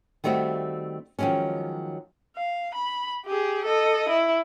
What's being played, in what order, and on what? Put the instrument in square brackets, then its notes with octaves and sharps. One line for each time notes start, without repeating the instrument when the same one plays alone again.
[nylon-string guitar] D#3 G3 A3 C4 F#4
D#3 F3 F#3 G#3 C#4
[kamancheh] F5
B5
G4 G#4
A4 D#5
E4